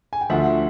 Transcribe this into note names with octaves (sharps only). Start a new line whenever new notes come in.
G#5
G5
D2 D3 F3 E5 F#5